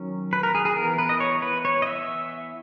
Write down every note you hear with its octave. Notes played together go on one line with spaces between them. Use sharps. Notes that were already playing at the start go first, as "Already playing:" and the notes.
Already playing: D#3 F#3 C#4
B4
A#4
G#4
G#4
E3 B3 A#4
B4
D#5
C#5
B4
C#5
D#5
E5